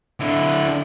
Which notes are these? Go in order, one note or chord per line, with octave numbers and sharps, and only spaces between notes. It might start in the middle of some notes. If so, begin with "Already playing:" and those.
D3 E4